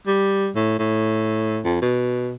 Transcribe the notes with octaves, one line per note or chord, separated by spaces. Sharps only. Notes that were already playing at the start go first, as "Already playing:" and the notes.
G3
A2
A2
F2
B2